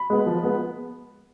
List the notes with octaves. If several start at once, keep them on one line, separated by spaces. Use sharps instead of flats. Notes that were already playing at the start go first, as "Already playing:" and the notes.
Already playing: B5
G#3 B3
F3
G#3 B3